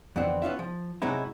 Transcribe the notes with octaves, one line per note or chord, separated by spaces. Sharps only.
F2 D3 E3 B3 C4
B3 C#4 F4 E5
F3
F#2 C3 F#3 G#3 D#4 E4